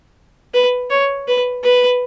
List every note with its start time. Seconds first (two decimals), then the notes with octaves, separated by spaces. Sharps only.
0.54 B4
0.90 C#5
1.28 B4
1.64 B4